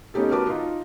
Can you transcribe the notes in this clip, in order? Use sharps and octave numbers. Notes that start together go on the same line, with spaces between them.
A3 B3 C#4 D#4 G4 A4
F#4 G4 A#4 B4 A5 D6
D#4 F4